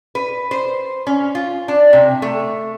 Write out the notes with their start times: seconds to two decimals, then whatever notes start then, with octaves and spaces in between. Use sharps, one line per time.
0.15 B4
0.51 C5
1.07 C#4
1.35 F4
1.68 D4
1.93 C3
2.22 A3